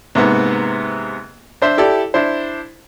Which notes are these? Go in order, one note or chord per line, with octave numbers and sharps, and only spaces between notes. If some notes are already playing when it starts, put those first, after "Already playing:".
G#2 C3 A#3 B3
D4 C5 E5
E4 G4 A4 D5
D4 E4 C5